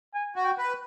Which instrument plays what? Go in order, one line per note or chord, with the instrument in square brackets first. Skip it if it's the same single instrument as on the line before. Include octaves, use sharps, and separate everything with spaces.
[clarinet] G#5
[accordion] F#4
[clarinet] G5
[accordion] B4